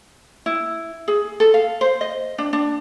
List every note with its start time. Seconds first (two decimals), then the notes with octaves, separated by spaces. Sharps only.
0.46 E4
1.08 G#4
1.40 A4
1.54 F5
1.81 C5
2.01 D#5
2.38 D4
2.53 D4